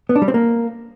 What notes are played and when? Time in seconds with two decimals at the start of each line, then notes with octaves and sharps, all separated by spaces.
0.09 B3
0.16 D4
0.22 G3
0.28 C4
0.34 A#3